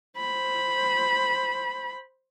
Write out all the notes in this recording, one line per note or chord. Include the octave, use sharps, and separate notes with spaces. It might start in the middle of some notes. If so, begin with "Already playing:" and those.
C5 B5